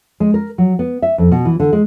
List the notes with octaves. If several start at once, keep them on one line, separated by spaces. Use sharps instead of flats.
G#3
A#4
F#3
B3
E5
F2
B2
E3
D3
G#3